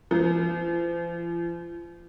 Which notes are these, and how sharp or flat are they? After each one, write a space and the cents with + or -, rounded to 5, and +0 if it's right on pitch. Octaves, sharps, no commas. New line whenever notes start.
F3 -40